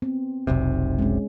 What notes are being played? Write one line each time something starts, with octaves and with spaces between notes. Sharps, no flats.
B3 C4
F1 B1 C3
G#3 C#4